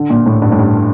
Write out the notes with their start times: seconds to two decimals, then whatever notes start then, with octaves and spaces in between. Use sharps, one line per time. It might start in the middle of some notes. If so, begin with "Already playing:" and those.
Already playing: D3
0.10 A#2
0.26 A2
0.42 G2
0.52 A2
0.59 G2